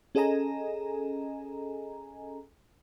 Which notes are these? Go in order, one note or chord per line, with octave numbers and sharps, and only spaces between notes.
C#4 G#4 A4 D#5 G#5 A#5